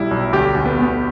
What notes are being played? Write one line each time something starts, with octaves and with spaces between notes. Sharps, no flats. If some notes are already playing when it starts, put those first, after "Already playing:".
Already playing: B1 G3 E4
B1
D2 G4
D2
B3
D2 B3